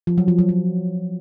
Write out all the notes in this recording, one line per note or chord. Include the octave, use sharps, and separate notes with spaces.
F3
F#3
F3
F#3
F#3